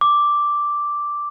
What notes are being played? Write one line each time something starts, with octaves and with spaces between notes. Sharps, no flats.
D6